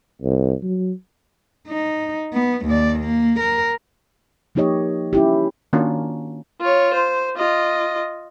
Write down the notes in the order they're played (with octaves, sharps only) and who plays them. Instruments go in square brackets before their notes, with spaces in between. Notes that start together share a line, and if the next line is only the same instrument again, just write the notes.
[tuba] C2
F#3
[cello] D#4
B3
D#2 D5
A#3
A#4
[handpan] F3 A#3 D#4 G4 C#5 D#5
C#4 E4 G4
[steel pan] D#3 A#3 C#4 D4 F4 F#4
[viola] F4 C#5
C5
F4 D#5